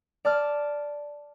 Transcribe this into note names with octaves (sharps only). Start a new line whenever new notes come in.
D5 A5 D6 F6